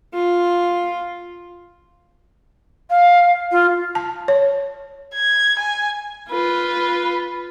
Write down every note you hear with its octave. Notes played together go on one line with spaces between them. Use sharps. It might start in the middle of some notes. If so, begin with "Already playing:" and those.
F4
F5
F4
A5
C#5
G#6
G#5
F4 B4